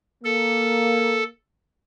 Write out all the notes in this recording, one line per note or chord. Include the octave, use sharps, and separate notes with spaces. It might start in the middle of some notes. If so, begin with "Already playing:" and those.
A#3 A4